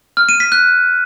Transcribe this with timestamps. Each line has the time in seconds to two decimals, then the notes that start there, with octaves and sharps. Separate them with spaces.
0.17 F6
0.29 D#7
0.40 B6
0.52 F#6